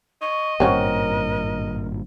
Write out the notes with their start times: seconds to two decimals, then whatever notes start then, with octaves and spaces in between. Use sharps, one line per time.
0.22 D#5 C#6
0.60 G#1 G2 A#2 C4 C#4 F#4 A#4